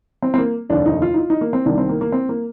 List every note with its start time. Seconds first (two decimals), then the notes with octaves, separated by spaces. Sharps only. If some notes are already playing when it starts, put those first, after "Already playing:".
0.23 C4
0.34 C4
0.38 A#3
0.69 F1 D#2 D3 D4
0.86 D#4
1.02 F4
1.14 D#4
1.18 F4
1.30 D#4
1.41 A#3
1.53 C4
1.65 C2 C3 D#3 D4
1.78 C4
1.89 A#3
2.01 A#3
2.12 C4
2.29 A#3